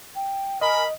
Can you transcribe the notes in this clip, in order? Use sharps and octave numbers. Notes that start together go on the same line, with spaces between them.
G5
A#4 D#5 G#5 B5